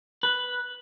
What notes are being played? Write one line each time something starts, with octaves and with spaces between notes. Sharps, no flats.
B4